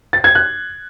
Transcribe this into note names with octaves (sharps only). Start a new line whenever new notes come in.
A6
G#6
F#6